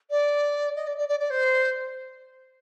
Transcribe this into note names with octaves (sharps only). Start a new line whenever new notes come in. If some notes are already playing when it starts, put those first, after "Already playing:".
D5
D#5
D5
D5
D5
D5
C5